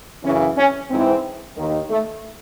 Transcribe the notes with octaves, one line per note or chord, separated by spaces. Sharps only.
F#2 C#3 E3 C#4
C#4
G#2 E3 C4
D#2 D#3
A3